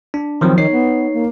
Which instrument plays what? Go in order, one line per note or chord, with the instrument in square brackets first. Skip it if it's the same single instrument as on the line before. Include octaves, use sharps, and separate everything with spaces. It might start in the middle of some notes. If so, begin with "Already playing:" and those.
[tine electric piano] D4
[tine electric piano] D#3 F3 F#3 [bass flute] C4
[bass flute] D#3 [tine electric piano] D#4 C#5 C7
[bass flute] B3
A#3